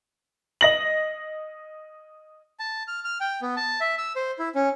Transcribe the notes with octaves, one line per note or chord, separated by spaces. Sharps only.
D#5 A#6 F#7
A5
F6
F6
G5
B3
A5
E5
E6
C5
E4
C#4